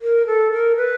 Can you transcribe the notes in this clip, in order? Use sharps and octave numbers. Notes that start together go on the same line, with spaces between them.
A#4
A4
A#4
B4